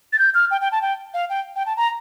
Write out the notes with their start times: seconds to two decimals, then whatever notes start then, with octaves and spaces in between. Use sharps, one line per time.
0.13 A6
0.19 G6
0.35 F6
0.51 G5
0.61 G5
0.72 A5
0.82 G5
1.14 F5
1.29 G5
1.56 G5
1.66 A5
1.77 A#5